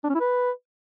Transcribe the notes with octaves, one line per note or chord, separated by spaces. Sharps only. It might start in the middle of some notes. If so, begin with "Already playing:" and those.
D4
C#4
E4
B4